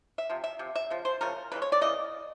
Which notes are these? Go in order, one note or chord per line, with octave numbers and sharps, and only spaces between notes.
E5
C3 F3
E5
C3 F3
E5
C#3 F3
C5
C#3 F3 A3 C#4 A#4
C#3 E3 G#3 B4
C#5
D5
C#3 E3 D#5